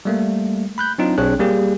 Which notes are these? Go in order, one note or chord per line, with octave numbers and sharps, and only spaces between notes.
G3 A3 A#3
B5 F#6 G6
F#3 C4 D4 D#4 F4
B1 C4 D4 G#4 C#5 F#6
G3 A#3 G4 G#4